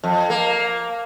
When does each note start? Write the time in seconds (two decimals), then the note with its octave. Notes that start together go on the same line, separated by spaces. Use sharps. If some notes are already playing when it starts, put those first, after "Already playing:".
0.04 F2
0.30 A#3